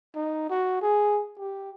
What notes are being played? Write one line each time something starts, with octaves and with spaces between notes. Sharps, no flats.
D#4
F#4
G#4
G4